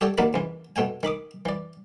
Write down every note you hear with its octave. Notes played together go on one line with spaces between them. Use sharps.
G4 A4 C#5 D5 G5
D#2 D#3 F#3 A#3 D5 B5
C#2 E3
B2 A3 G5 G#5
D#3 B5 D6 D#6
E3 D5